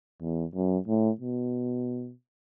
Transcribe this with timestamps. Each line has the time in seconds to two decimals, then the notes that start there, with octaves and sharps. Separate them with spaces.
0.22 E2
0.55 F#2
0.87 A2
1.21 B2